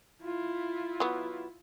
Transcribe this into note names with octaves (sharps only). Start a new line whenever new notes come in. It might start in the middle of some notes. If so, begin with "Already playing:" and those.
E4 F4
F#3 B3